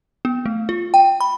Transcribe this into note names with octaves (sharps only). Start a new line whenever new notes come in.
B3
A3
F4
G5
B5